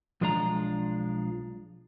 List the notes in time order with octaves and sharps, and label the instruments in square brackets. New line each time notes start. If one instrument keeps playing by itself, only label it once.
[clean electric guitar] B1 F3 G#3 D4 F4 A#5